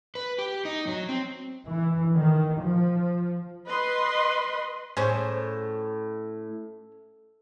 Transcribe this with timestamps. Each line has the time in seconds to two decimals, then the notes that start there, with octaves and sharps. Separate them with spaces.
0.15 B4
0.38 G4
0.65 D#4
0.88 F#3
1.09 C4
1.66 E3
2.15 D#3
2.62 F3
3.68 B4 D#5 C6
4.97 A2 C#4 G#4 C5